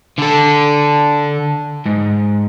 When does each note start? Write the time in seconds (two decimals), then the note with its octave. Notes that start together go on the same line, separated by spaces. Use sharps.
0.19 D3 A4
1.86 G#2